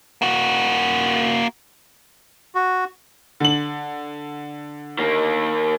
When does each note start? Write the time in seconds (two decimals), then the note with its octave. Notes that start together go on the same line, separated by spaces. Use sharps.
0.22 A#3 F#4
2.55 F#4
3.40 D3 F#7
4.99 D#3 A#3